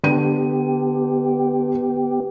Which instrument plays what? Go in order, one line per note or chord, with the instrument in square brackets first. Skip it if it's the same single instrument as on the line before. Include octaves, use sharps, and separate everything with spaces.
[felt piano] D3 D#7 [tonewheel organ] B3 G4